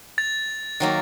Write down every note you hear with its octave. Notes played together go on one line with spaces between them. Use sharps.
A6
D#3 F#3 A#3